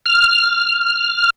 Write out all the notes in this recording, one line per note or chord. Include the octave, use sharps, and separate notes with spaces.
F6